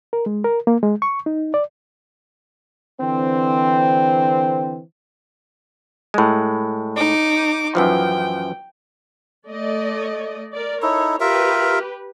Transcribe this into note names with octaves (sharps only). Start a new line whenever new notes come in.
A#4
G#3
A#4
A#3
G#3
C#6
D#4
D5
D3 E3 C4
A2 G#3
D#4 D6
F#2 E3 F3 G5
A3 D5 D#5
A#4 D5
D#4 E4 A4 C#5
F4 G4 A#4 B4 E5